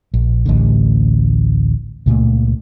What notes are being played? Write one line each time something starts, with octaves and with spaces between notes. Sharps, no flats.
A#1
A1 D2 D3
C#2 A#2 A3